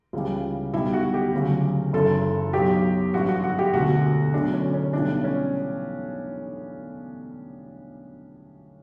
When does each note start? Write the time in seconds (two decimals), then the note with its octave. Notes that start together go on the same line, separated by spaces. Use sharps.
0.13 C#2 C#3 E3 G3
0.74 B1 B2 G3 E4
0.93 F#4
1.14 G4
1.33 D2 C#3 F#3
1.93 F#1 F#2 E3 A4
2.53 B1 B2 F#3 G4
3.13 A1 G2 F#3 F#4
3.29 F#4
3.44 F#4
3.58 G4
3.73 E1 D2 D3 F#4
4.34 E1 D2 D3 F#3 D4
4.53 C#4
4.74 C#4
4.93 B1 A2 E3 G3 D4
5.24 C#4